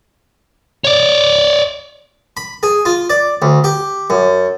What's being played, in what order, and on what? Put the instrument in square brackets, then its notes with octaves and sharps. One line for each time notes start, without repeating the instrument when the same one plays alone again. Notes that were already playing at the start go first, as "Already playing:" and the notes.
[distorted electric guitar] C#5 D5
[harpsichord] B5
G#4
F4
D5
D2
G4
F#2